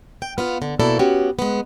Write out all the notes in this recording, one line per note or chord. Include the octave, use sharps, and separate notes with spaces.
G5
B3 F4 F5
D3
B2 E3 A#3 E4 A4 D5
B3 C#4 F#4 G4
G#3 B3